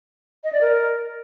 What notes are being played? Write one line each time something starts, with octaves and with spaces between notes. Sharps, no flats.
D#5
D5
A#4